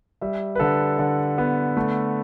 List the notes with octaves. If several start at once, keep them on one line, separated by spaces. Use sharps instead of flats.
G3 E5
B4
D3 A4
D3
B3
A3